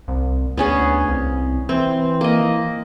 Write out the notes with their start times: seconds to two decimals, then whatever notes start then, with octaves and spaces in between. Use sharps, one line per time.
0.08 C2
0.57 D2 B3 C#4 G#4
1.08 C2
1.69 E3 C4
2.21 A#3 D#5